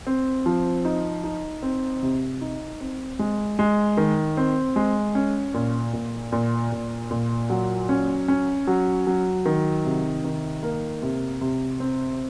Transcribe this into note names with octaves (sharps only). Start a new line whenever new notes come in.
C4
F3
D#4
D#4
C4
C3
D#4
C4
G#3
G#3
D#3
C4
G#3
C#4
A#2
A#2
A#2
A#2
A#2
F#3
C#4
C#4
F#3
F#3
D#3
C3
D#3
A#3
C3
C3
C4